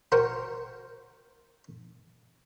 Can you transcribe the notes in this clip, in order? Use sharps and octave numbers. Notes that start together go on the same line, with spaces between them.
F#4 A#4 C5 F#5 G5